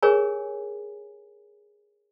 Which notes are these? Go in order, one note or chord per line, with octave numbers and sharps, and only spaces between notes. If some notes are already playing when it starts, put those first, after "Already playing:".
G4 G#4 A#4 C#5 G#5